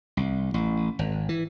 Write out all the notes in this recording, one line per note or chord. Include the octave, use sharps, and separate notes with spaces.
C2
A1
G#1
E3